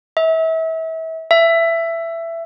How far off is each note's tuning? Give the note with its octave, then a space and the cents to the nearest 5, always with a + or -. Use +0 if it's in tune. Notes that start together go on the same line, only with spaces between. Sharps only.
E5 -30
E5 +15